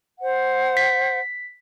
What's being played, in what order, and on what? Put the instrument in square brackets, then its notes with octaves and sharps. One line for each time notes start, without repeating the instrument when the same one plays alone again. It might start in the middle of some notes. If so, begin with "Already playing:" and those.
[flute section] C5 F#5
[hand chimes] B6